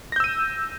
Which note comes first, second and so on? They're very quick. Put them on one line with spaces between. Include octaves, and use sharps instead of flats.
A#6 G6 E6 D#7